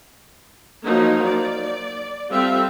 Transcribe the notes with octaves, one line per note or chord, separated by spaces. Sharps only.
F3 F#3 A#3 D#4
D5
G3 C4 F4 A4 E5 F5